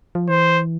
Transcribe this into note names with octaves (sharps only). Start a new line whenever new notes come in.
F3
E3 C5